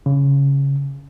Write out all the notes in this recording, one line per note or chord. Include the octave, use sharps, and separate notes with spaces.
C#3